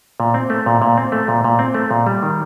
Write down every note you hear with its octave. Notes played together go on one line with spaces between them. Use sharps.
A#2
C4
A3
A#2
A#2
C4
A3
A#2
A#2
C4
A3
A#2
G3
D#3